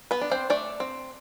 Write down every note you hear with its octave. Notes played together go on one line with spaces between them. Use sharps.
B3 B4
D4
C4 C5
A3 D4 D5
C4